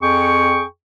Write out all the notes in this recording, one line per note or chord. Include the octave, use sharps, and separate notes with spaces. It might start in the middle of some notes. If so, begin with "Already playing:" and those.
F2 G#4 G5 C#6